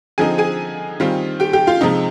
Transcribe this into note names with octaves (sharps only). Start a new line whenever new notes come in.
D3 F3 C4 D#4 G#4 G#5
G#4 G#5
D#3 G3 C4 F4
G4 G5
G4 G5
F4 F5
C3 F3 G#3 D#4 D#5